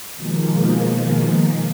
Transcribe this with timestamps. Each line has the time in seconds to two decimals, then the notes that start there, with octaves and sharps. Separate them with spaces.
0.15 B2 D#3 F3 G#3 A#3